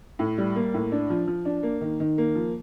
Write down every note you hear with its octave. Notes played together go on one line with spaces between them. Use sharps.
A2
G3
A#3
A2
D4
F3
F3
D4
A#3
D#3
D#3
A#3
F3